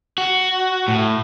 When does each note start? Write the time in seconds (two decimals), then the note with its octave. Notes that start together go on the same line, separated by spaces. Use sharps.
0.18 F#4
0.88 A2